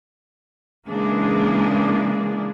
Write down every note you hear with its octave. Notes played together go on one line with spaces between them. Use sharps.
C#3 E3 G#3 A#3 D4 G#4